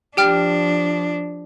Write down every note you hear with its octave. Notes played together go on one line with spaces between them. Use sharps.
F3 D4 G4 G5 F6